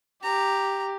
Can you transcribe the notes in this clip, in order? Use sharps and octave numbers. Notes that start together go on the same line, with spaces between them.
G4 A#5